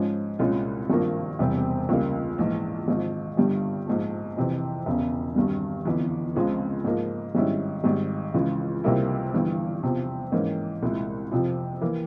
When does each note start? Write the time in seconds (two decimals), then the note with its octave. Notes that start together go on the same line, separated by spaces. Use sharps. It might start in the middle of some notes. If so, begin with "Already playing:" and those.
Already playing: G#2 F3 G#3 C#4
0.39 C2 A#2 G#3 C#4 F4
0.90 G#1 G2 F3 A#3
1.39 E1 E2 C3 G3 C4
1.89 C#2 C#3 G3 A#3
2.38 A#1 G#2 E3
2.88 G#1 G#2 F3
3.37 G1 G2 G3
3.87 A#1 G#2 F3
4.37 F2 C3 E3
4.86 E1 E2 C#3
5.35 G#1 G2 G3
5.85 G1 F2 E3
6.35 C#2 C#3 F3 G#3 C4
6.84 G#2 F3 A#3
7.35 G#1 G#2 G3 C#4 E4
7.84 G#1 G#2 G3
8.34 C#2 C#3 E3 G#3
8.84 C#2 C3 G3 A#3 E4
9.33 G1 G2 E3 G3
9.83 E2 C3 F3
10.32 G#2 E3 A#3 C#4
10.83 C2 A#2 G#3 E4
11.31 F2 C3 F3
11.81 E3 A#3